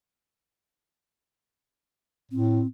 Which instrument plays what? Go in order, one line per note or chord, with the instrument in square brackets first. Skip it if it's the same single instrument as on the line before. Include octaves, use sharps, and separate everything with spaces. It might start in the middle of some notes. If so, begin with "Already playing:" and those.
[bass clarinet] A2 [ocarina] C4